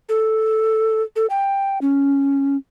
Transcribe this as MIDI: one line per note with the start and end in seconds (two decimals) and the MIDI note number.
0.09 1.03 69
1.16 1.26 69
1.30 1.79 79
1.82 2.57 61